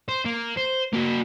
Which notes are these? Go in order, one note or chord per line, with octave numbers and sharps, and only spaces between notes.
C5
A#3
C5
A#3 F#4